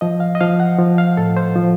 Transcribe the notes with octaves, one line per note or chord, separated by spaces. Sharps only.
F3 D#5
F5
D#5
F3 F5
F#5
F3
F5
A2 A4
C5
F3